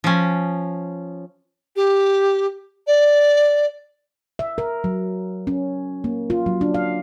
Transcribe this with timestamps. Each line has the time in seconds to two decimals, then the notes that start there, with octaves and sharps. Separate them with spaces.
0.04 F3 C#4
1.76 G4
2.87 D5
4.39 E5
4.58 A#4
4.84 F#3
5.47 C#4
6.04 A#3
6.30 F4
6.46 F#3
6.61 D4
6.74 F5